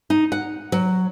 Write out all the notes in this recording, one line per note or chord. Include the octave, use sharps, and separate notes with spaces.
D#4
F#5
F#3